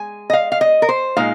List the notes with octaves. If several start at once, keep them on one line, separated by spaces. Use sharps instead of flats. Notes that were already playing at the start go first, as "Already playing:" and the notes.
Already playing: G#3 G#5
D#5
F5
F5
D#5
A#4
C5
A#2 G#3 D#4 F5